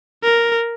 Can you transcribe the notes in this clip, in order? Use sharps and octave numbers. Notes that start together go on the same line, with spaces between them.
A#4